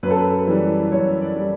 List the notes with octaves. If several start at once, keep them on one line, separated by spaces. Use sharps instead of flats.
F#2 B4
A4
B4
E3 G3
F#2 C#5
D5
E3 G3